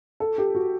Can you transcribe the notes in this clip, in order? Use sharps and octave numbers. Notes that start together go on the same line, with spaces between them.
A4
G4
F#4